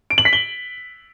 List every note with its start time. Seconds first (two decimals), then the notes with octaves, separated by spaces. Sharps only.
0.10 D7
0.18 F#7
0.25 B6
0.33 G7